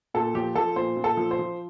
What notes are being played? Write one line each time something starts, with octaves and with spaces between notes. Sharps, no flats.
A#2 A4
F3 G4
F3 A4
A#2 C5
A#2
A4
F3
C5
F3